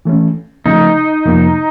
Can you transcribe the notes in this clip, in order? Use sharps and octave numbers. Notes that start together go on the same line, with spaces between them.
E3 A3 C#4
C#3 F3 A3 D#4
F2 C3 F3 A#3